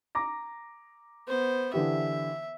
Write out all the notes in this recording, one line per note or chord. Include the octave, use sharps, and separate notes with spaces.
A#5 D6 A#6
B3 C5
D3 E3 G4 E5